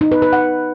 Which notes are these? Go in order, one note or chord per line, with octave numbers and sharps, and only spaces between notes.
D#4
B4
B4
F#5